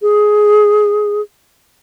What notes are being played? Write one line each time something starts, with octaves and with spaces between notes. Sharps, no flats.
G#4